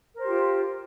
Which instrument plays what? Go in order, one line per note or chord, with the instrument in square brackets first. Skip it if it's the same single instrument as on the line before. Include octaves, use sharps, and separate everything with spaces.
[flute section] A#4
C5
G4
F4